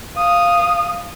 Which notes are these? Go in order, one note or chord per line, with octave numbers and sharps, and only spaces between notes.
F5 D#6